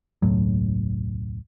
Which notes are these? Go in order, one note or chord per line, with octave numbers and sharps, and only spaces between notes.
E1 C#2 A2 F#3